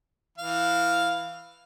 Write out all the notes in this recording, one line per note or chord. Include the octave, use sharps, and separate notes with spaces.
E3 F5